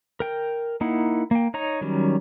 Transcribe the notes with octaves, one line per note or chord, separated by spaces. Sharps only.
A#4 G5
A#3 D#4 E4 F#5
A#3 G5
D#4 C#5 A#5
D#3 F#3 G3 C#4